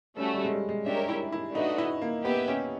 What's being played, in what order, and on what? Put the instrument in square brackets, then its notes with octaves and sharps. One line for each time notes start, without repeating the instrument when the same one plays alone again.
[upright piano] G3 [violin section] A3 C#4 F#4 A4
[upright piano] G3
G#3
G3
G#3
[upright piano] D4 [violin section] G4 A#4 C#5 E5
[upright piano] E4
E4
[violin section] A3 D4 F#4 B4 D#5 [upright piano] D#4
[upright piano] E4
A#3
[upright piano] B3 [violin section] G4 B4 E5
[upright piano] C#4